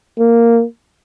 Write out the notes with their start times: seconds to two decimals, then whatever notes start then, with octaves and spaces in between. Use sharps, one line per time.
0.19 A#3